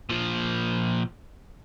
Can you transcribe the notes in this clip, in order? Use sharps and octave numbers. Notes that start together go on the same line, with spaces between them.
A#2 F3